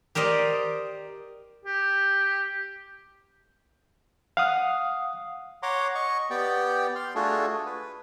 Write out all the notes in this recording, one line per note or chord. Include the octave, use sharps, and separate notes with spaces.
G4 A#4 C5 D5 D#5
G4
F5 F#5 D#6
C#5 F#5 A#5 C6 D6
D#5 C#6
B3 G4 D5 G5
C6 F6
A3 D4 F4 F#4 G#4 A4
B4